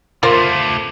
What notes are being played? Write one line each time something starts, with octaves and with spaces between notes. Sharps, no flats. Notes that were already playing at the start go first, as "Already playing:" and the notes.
C3 A3 F4 A#4 C5